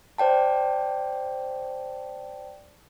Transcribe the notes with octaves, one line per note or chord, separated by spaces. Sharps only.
C5 D5 G5 A5